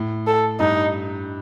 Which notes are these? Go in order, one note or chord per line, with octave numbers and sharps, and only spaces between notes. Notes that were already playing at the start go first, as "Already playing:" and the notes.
Already playing: A2
A4
G2 D#4